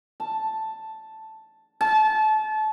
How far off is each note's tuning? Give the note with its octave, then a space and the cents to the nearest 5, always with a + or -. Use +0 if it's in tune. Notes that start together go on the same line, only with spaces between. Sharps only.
A5 +0
A5 -30